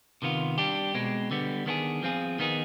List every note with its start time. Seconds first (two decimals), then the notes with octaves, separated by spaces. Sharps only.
0.22 C3 D#3 B3 F4
0.58 G3 D4 G4
0.94 B2 G#3 C4
1.31 D3 G3 B3
1.66 D#3 B3 D4 F4 G#4
2.02 F3 C4 F4 G#4
2.39 D#3 B3 D#4 G#4